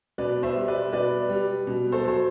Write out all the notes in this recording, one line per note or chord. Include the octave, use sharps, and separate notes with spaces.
B2 B4 D5
C5 E5
G3
B4 D5
B2 B4 D5
G3
B2
A4 C5
F#3 C5